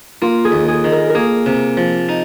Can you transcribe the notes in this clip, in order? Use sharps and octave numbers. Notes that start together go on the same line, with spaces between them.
A#3 F4
G#4
D#2
G#4
D#3
A#4
A#4
A#3 G#4
C3
F3
D#4